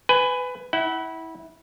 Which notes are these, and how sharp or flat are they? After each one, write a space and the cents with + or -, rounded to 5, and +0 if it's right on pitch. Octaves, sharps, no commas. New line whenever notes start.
B4 +20 G#5 +0
E4 -20 F#5 +25